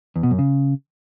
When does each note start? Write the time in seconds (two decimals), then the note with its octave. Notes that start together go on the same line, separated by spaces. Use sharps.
0.16 E2
0.23 B2
0.31 F#2
0.39 C#3